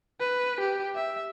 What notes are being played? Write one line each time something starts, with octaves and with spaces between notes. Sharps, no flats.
B4
G4
E5